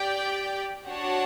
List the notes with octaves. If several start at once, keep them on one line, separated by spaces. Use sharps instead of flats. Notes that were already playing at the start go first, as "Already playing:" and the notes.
Already playing: G4 D5 G5
D4 F#4 C#5 F#5 A5